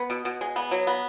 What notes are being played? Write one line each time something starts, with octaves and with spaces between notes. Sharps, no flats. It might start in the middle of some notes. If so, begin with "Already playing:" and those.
Already playing: B3
B2
B2
G#3
B3
F#3
B3